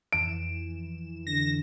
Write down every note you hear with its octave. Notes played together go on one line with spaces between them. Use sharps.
F2 E3 D7 E7
D3 A#6